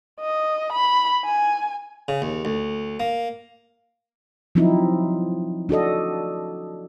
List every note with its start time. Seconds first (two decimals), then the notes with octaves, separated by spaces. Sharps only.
0.20 D#5
0.73 B5
1.25 G#5
2.08 C#3
2.22 D#2
2.45 D2
3.00 A#3
4.55 F3 F#3 C4 D#4 E4
5.69 D4 F#4 A4 D#5